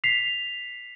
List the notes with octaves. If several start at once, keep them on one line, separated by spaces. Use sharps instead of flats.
B6 C7 F7